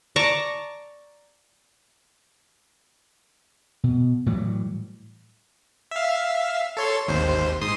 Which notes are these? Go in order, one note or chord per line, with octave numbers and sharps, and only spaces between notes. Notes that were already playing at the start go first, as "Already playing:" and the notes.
D5 A5 A#5 C#6
B2
A2 E3 F#3 G3
E5 F5
A4 C#5 C6
G#1 D#2 C5
G#2 C6 D#6